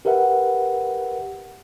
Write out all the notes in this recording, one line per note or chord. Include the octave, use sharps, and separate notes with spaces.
G4 A#4 B4 E5 F#5